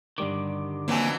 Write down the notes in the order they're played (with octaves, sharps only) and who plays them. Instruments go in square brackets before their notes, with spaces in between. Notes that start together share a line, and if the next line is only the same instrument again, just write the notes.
[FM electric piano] G2 G3 D6 [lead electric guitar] D3 D#3
[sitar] F2 E3 F#3 [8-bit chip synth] A#3 G#5